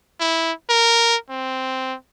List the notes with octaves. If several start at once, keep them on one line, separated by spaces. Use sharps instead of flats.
E4
A#4
C4